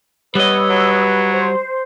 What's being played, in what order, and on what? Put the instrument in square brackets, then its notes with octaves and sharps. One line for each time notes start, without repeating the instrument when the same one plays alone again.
[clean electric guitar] G3 D#5 [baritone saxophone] B3 [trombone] B4 [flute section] C#5 D#6 E6
[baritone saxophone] F#3
[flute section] C5